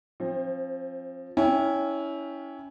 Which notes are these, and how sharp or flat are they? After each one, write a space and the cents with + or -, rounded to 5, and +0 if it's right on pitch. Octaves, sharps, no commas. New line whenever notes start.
F3 +0 C4 +30
C#4 +15 E4 -15 G5 +25